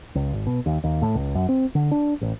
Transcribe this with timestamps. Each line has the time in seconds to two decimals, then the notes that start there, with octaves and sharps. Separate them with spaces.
0.15 C#2
0.33 G#1
0.47 B2
0.66 D#2
0.84 D#2
1.02 A2
1.15 C#2
1.35 F#2
1.49 C4
1.75 D3
1.91 D4
2.21 A1